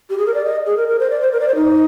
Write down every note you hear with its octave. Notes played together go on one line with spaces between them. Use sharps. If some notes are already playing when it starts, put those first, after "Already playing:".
G4
G#4
A#4
D5
D#5
G#4
A#4
A#4
C5
D5
C5
A#4
D5
C5
D#4